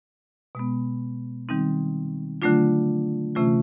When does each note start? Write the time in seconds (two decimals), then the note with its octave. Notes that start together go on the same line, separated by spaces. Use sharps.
0.55 B2 G#3 B3
1.49 D#3 G3 C4 D#4
2.42 D3 F#3 A3 D4 F4
3.35 C3 E3 A3 C#4 F4